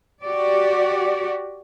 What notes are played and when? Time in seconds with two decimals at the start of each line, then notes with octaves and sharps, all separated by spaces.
0.23 F#4 G4 D5